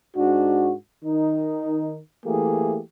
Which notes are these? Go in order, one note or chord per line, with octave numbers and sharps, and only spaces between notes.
G#2 D4 F#4
D#3 D#4
E3 A3 A#3 G4 G#4